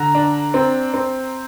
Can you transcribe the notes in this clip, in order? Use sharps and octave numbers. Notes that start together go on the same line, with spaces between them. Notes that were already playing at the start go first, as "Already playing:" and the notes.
Already playing: D3 A#5
D4
C4
C4